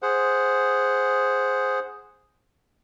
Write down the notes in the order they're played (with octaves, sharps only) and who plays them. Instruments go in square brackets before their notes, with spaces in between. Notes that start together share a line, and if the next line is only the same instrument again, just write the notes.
[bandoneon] G#4 C5 F#5